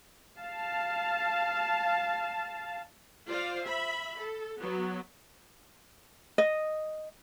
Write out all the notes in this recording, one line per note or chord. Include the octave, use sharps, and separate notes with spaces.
F5 A5
F4 C5 D5 F5
E5 B5
A4
F#3 B3
D#5